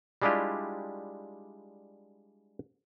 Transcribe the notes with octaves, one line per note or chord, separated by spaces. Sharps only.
G3 G#3 D4 E4 F4 G4